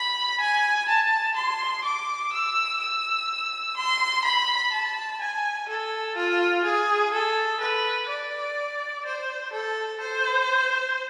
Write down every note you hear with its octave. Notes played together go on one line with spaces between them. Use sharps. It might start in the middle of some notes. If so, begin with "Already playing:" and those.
Already playing: B5
G#5
A5
C6
D6
E6
E6
C6
B5
A5
G#5
A4
F4
G#4
A4
B4
D5
C5
A4
C5